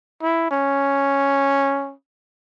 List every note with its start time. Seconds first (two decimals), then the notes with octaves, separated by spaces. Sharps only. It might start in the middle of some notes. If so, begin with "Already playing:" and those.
0.22 E4
0.51 C#4